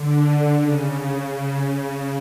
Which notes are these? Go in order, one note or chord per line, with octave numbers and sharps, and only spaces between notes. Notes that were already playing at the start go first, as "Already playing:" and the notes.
Already playing: D3
C#3